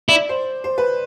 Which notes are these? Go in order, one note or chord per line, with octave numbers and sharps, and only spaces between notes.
E4 D5
C5
C5
B4